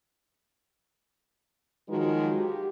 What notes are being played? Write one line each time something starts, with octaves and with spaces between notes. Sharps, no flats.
D#3 F3 F#3 G#3 F#4 A#4
G4